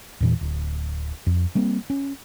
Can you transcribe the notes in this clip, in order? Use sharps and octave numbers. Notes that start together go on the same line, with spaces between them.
E2 A#2 E3
D1
F2
G3 A#3 C4
C#4